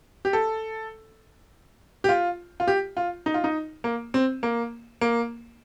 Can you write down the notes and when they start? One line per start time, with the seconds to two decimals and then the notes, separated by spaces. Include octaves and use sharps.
0.25 G4
0.33 A4
2.04 G4
2.09 F4
2.60 F4
2.68 G4
2.97 F4
3.26 D#4
3.34 F4
3.44 D#4
3.84 A#3
4.14 C4
4.43 A#3
5.01 A#3